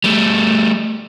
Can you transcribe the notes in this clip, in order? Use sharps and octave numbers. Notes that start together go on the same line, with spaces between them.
G3 A3